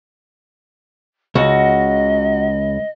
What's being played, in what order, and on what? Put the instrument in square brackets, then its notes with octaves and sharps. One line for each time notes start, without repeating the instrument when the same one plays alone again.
[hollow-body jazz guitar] C#2 [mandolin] F#4 [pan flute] D#5